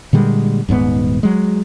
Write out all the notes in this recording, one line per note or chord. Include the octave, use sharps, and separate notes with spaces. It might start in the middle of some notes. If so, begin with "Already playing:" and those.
A#2 D3 G3 G#3
D#1 G#2 G3 B3
F#3 G#3